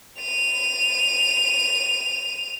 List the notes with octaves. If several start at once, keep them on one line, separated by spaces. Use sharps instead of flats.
D#7 F7